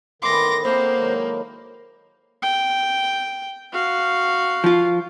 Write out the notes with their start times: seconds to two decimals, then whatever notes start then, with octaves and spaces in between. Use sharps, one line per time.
0.22 A2 D#3 E3 B3 C6 D6 A#6
0.63 A#3 C4 C5 D#5
0.96 D#3 F#3 G#3
2.42 G5
3.73 F#4 F5
4.64 F3 F4